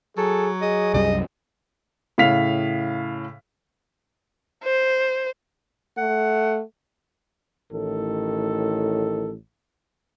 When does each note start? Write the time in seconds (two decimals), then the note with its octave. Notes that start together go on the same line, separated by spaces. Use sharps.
0.17 F#3 G#4 A4
0.62 G#4 D#5
0.94 C2 F#2 G3 D#5
2.18 A2 C#3 F5 B6 F7
4.63 C5
5.98 A3 F#5
7.72 A1 A2 D#3 A4